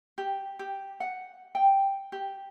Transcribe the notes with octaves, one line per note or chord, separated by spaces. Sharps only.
G4
G4
F#5
G5
G4